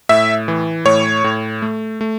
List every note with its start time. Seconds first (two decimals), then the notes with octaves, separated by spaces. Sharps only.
0.09 A2 E5
0.48 E3
0.85 A2 C#5
1.24 A2
1.62 A3
2.01 A3